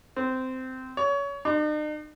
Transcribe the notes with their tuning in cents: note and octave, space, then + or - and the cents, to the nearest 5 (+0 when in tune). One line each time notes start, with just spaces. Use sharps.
C4 -15
C#5 +25
D#4 -45